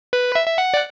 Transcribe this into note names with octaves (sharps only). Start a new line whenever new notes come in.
B4
E5
E5
F#5
D5